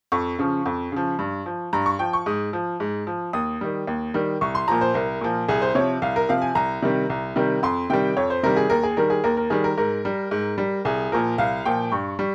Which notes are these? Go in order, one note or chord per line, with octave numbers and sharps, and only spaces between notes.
F2 C#6
C#3 F3
F2
C#3 F3
G2
F3
G2 A#5
C#6
F3 G5
C#6
G#2 D#6
F3
G#2
F3
D#2 D#6
D#3 G3
D#2
D#3 G3
C2 C#6
C6
A#2 F3 A#5
C5
C2 A#4
A#2 F3
C2 G#4
C5
C3 F3 C#5
C2 F5
A#4
C3 F3 F5
G#5
C2 A#5
C3 D#3 G3
C2
C3 D#3 G3
F2 C6
C3 D#3 G3 G5
F2 C#5
C5
C3 D#3 G3 A#4
G#4
D#2 A#4
G#4
D#3 G3 A#4
G#4
D#2 A#4
A#4
D#3 G3 G#4
A#4
G#2 A#4
G3
G#2
G3
C2 G#4
A#2 F3 A#4
C2 F5
A#2 F3 G5
G2 C#6
G3